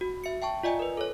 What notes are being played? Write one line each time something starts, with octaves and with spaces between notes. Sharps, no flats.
F#4
E5 C#7
E5 G5 A5 C#6
F4 D5 D#5 G#5
A#4 B4
A4 C#5